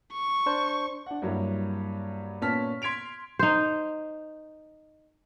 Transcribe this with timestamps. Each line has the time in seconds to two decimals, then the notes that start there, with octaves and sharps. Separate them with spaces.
0.13 C#6
0.46 D4 C5
1.06 D4 F#5
1.22 G2 F#3 A#3 E4
2.41 A#2 B3 C#4 A5 F6 B6
2.82 C6 G#6 B6 D7 F7
3.39 D#4 C5